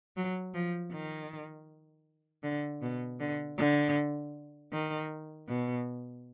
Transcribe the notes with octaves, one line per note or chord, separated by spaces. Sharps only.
F#3
F3
D#3
D3
B2
D3
D3
D#3
B2